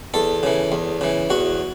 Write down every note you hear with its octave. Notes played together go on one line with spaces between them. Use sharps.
E2 A4
C#3 E3
E2
C#3 E3
E2 F#4